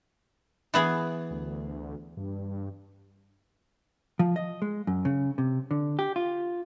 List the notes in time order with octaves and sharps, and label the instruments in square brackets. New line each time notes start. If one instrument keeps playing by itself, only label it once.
[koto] E3 B3 G#4
[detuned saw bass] D2
G2
[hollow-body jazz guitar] F3
D#5
G#3
F#2
C#3
C3
D3
G4
F4